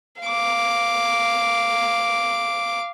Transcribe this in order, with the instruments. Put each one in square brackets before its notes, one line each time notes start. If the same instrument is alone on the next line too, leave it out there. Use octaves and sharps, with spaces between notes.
[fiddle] F5 D6